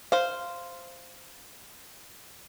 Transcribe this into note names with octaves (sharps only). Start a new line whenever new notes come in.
C5 F5